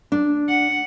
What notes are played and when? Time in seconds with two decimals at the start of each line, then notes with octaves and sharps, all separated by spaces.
0.12 D4
0.49 F#5